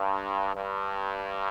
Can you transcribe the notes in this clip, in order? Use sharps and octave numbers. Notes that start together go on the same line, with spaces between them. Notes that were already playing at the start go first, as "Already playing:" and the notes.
Already playing: G2
G2